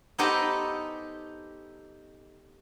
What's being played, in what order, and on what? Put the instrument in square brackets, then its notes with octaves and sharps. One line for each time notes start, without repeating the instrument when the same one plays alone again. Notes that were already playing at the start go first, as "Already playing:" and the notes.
[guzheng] B3 D#4 G4 A4 C5 D#5